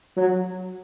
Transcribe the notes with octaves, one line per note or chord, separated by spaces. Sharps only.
F#3